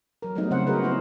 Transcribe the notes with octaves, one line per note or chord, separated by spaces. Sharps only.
F#3 A#4
F#3 G3 A3 B3 D#4
C#3 C4 C5 F#5
F#4 G#4 A#4 B4
B3 E4 C5